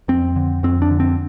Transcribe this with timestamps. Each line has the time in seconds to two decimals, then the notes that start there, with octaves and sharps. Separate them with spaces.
0.08 F2 C4
0.36 D3
0.63 F2 C4
0.82 D4
0.91 D3
1.00 C4